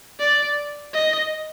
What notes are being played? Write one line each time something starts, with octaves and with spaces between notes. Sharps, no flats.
D5
D#5